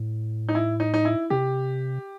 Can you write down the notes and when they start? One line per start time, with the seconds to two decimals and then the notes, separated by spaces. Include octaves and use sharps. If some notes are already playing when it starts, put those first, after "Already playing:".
Already playing: A2
0.49 D#4
0.55 E4
0.80 D#4
0.94 D#4
1.05 E4
1.30 C3 G4